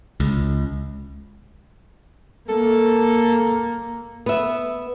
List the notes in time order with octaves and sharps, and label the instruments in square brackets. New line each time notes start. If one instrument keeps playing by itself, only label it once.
[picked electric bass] C#2
[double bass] A#3 [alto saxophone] A4
[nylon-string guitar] B3 E5